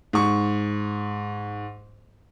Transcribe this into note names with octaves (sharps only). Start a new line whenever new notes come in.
G#2 C#6